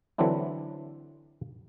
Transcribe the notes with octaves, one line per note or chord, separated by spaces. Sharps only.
D3 E3 F#3 C4 D4 E4